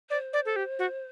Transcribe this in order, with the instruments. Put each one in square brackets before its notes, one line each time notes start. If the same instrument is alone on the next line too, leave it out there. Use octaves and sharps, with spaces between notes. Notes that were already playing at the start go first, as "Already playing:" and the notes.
[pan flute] C5 [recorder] D5
[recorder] D5
A4
G4
F#4